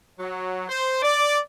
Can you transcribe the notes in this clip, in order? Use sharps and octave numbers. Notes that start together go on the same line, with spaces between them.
F#3
C5
D5